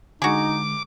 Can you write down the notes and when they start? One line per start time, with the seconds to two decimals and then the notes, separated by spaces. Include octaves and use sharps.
0.22 D3 G#3 D#4 F#4 G#4 D6